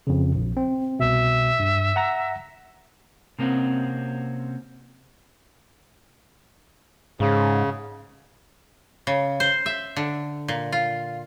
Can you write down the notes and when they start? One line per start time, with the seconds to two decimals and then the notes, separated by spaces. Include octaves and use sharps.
0.07 F2 C#3
0.35 A#1
0.57 C4
0.99 C2 B2 E5
1.59 G2
1.96 F#5 A#5 A#6
3.39 C3 A#3 C4 C#4 F#4
7.20 G#2 C#3
9.07 C#3
9.40 C5
9.66 E5
9.97 D3
10.48 A#2
10.72 F4